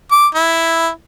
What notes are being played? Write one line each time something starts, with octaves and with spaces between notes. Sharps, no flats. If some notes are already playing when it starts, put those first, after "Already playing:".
D6
E4